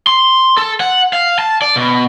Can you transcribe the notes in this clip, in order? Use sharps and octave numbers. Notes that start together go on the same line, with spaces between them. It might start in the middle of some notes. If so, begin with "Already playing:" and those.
C6
A4
F#5
F5
A5
D5
B2